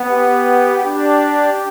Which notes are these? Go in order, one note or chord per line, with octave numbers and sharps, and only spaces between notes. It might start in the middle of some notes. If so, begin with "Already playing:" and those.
Already playing: B3
G4
D4 G4